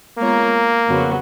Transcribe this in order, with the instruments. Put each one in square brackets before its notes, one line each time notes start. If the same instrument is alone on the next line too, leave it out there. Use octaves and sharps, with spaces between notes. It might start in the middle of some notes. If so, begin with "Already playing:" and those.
[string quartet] G#3 B3 F4 A#4 C#5 [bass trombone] A#3
[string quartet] F2 C#3 F#3 B3 F#4